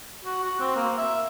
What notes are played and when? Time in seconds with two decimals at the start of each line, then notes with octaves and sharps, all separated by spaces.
0.25 F#4
0.44 F#4
0.60 C4
0.76 A#3
0.98 E5